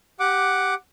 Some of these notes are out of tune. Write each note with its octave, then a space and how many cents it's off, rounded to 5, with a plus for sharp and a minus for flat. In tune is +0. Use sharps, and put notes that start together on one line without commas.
G4 -5 F#5 +0 D6 +0